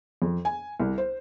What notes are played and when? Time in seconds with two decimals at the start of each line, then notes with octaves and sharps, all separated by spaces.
0.22 F2
0.45 G#5
0.80 C2
0.98 C5